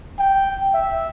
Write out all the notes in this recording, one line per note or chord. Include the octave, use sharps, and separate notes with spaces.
G5
E5